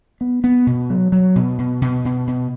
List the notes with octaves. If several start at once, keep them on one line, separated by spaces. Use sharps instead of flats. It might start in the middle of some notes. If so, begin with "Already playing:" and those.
B3
B3
B2
F#3
F#3
B2
B2
B2
B2
B2